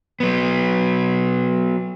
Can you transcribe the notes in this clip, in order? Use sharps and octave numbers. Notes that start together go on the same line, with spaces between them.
F#3 B3